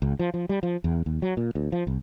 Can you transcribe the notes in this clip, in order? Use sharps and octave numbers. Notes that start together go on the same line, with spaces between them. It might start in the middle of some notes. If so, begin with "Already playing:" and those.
C#2
F3
F3
G3
F3
E2
D#2
F#3
A#2
D2
F3
C2